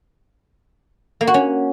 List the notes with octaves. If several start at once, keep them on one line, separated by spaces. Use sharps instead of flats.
A#3
F#4
C#4